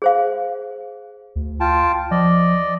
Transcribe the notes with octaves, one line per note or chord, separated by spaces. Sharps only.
G#4 C5 F5
D2
F4 G5 A5
F3 D5 D#5